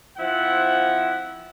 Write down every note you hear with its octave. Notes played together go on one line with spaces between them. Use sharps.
F3 C4 E4 F#5